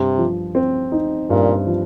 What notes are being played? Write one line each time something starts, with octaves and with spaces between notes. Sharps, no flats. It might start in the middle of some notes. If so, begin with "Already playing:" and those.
Already playing: G2 C3
F3
C4
D#4
G2 A#2
F3